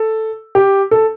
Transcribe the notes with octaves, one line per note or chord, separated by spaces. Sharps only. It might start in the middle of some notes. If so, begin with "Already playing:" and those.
Already playing: A4
G4
A4